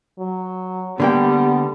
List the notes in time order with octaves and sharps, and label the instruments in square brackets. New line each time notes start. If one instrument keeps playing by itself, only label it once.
[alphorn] F#3
[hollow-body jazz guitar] D3 A#3 G5 [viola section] G3 [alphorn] B3